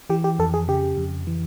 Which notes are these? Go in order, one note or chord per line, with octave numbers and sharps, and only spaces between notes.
E3 G4
G4
F2 A4
G#4
C#3 G4
F2
E3